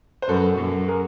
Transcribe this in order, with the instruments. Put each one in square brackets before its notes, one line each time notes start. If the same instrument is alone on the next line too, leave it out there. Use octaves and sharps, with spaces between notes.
[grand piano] C5
[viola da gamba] F#2 [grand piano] A4 B4
[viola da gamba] F#2
[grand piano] G#4 A#4